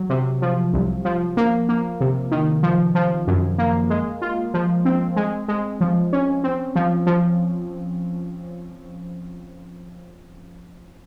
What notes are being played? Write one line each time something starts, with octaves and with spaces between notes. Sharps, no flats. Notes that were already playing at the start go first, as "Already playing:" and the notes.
Already playing: F#3
C3
F3
C2
F3
A#3
A#3
C3
D#3
F3
F3
F#2
A#3
G#3
F4
F3
C4
G#3
G#3
F3
C#4
C4
F3
F3